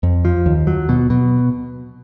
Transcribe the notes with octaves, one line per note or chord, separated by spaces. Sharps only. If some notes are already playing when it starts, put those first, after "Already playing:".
F2
F3
D#2
F#3
B2
B2